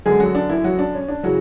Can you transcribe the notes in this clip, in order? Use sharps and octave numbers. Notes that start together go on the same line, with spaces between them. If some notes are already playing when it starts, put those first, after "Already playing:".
F#2 D3 G#3 G#4
F#3 F#4
D4
E3 E4
F#3 F#4
D4
C#4
D4
C#3 E3 F#3 F#4